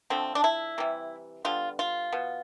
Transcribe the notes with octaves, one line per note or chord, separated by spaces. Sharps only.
D3 F3 A3 C4
D4
E4
C3 E3 G3
D3 G3 B3 F4
F4
B2 B3